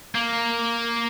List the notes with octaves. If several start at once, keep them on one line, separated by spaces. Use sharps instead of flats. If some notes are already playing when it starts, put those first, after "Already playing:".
A#3